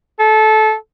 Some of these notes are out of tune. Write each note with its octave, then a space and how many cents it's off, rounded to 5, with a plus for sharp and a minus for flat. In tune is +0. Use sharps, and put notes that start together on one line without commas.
A4 -20